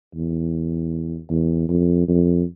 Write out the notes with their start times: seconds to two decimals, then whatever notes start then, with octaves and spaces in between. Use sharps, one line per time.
0.15 E2
1.30 E2
1.69 F2
2.08 F2